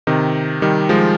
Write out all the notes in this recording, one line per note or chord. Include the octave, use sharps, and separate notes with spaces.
C3 D#3
D#3 G3
F3 G#3